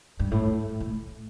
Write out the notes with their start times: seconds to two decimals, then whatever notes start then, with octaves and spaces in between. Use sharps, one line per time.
0.19 G2
0.31 A2
0.80 A2